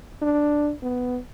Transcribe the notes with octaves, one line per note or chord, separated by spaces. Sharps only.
D4
B3